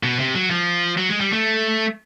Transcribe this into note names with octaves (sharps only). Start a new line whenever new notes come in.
B2
C3
F#3
F3
F#3
G#3
G3
A3